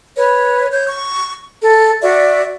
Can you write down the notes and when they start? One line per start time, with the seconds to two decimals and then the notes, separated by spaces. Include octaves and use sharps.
0.16 B4 C#5
0.72 C#5 G6
0.87 C#6
1.60 A4
2.02 F#4 D5 E5